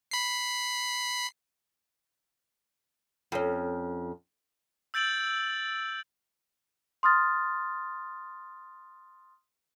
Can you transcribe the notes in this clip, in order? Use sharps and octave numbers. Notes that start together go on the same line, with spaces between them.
B5 C7
F2 C#4
E6 G6 A6 D7 F#7
C6 D#6 F6 A6